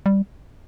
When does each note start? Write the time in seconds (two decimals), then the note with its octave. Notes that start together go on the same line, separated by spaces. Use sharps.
0.06 G3